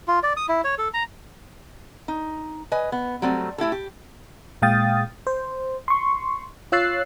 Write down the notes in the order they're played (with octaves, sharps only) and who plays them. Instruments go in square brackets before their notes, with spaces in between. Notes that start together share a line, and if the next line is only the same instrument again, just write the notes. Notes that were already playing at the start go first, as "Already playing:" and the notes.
[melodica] F4
D5
D#6
E4
C#5
A4
A#5
[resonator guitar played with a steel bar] D#4
B4 D#5 G#5
B3
F#3 G3 A3 C4
A3 E4 G4 A4
G4
[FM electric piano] A#2 G#3 F5 G5 D#6 A6
C5
C6 C#6
F4 C#5 E6 F#6 A6 C7